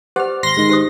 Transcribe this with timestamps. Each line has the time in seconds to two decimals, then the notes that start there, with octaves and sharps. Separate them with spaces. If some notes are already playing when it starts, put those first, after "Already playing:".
0.16 G4 C5 D5 F#5 F6
0.43 G#1 C6 A#6
0.57 G#2 D#3
0.69 G4 C5 D#6